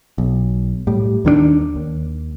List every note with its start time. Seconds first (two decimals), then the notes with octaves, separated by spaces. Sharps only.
0.18 B1
0.87 A2 G3
1.25 D#2 D#3 A#3 D4
1.76 D#2